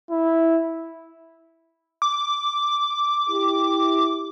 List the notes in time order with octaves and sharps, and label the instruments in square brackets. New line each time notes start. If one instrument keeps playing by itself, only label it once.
[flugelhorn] E4
[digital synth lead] D6
[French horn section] E4 G4